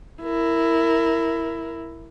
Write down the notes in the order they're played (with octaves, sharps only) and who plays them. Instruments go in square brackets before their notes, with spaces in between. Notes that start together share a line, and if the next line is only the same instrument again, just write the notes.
[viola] E4 A#4